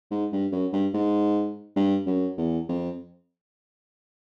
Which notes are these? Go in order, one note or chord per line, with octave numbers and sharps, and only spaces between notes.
G#2
G2
F#2
G2
G#2
G2
F#2
E2
F2